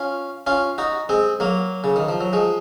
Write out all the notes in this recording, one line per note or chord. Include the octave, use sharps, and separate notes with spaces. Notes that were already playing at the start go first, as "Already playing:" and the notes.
Already playing: C#4 F4
C#4 F4
D#4 F#4
G#3 C4
F#3 A#3
C#3
D#3
F3
F#3
F3 G#3